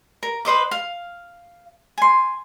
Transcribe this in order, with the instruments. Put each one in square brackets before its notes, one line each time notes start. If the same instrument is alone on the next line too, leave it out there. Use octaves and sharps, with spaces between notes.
[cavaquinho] A#4
B4 C5 D#5 D6
F5
G#5 C6